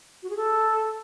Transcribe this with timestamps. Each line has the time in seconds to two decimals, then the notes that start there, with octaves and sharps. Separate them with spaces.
0.23 F#4
0.30 G#4
0.37 A4